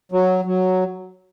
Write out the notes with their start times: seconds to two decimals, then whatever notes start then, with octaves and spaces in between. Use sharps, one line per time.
0.12 F#3
0.45 F#3